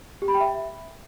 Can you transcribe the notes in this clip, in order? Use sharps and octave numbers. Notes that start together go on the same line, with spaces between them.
G4
B5
G5
E5